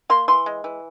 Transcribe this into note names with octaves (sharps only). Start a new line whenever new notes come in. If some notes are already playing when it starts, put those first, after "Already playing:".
A#3 C6
E3 C6
G#3
E3